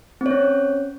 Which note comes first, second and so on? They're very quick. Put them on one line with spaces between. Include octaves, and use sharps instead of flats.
C4 C#5 C#4